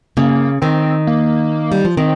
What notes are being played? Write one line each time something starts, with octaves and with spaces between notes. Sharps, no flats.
C#3 A#3
D#3 C4
A#3
G3
F3
D#3 C4